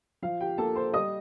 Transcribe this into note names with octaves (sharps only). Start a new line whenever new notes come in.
F3 F4 F5
G4 G5
A#3 A4 A5
C5 C6
G3 D#5 D#6